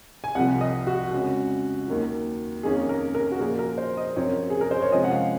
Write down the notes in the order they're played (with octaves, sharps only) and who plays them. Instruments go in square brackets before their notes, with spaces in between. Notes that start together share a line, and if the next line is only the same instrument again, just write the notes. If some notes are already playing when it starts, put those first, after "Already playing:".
[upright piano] G#5
C2 C3 F3 F#5
D#5
F#4
F2 C#3 G#3 C#4
D#2 D#3 F#3
F2 D#3 A#3 C#4 G#4
A#4
A#4
F#4
A#2 F3 A#3 G#4
A#4
C5
D#5
F#2 F3 C4 C#5
G#4
A#4
C5
C#5
C3 F3 G#3 C#4 D#5
F#5
F5